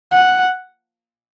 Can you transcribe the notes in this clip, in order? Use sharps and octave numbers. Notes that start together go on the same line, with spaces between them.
F#5